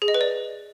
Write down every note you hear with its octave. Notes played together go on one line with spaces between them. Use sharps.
G#4
D#5
B4
D5